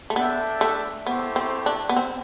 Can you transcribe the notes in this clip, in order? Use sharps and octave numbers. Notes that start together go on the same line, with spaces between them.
A3
B3 D4 A4 E5 G5
A3
A3 B3 E4 G4 C5
C4
D4
B3
C4